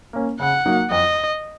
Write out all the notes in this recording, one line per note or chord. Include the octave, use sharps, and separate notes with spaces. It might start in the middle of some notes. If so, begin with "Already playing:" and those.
A#3 C#4
C#3 F#5
F#3 A#3 D#4
F2 D#5